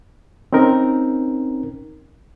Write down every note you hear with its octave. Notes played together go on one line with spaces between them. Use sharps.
C4 C#4 D#4 A#4